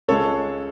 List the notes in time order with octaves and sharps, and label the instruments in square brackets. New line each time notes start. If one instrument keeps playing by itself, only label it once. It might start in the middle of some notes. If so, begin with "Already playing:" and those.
[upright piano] C#2 C#3 G#3 A4 C#5